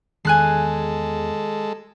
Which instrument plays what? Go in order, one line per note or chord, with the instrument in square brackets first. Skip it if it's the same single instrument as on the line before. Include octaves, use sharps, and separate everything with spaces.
[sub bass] E2 [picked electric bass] D#3 [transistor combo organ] G#3 A4 [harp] G#5 F#6 C7